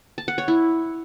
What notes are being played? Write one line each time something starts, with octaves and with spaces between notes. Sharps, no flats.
A5
F#5
C#5
E4